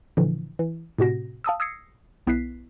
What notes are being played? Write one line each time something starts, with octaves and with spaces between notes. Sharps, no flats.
A#2 D3 E3 F3
E3
A2 C3 F#4 A#6
F5 A5 D#6 E6
D#6 E6 G#6 A#6 C7 C#7
B1 B3 E4 F#6 B6 C7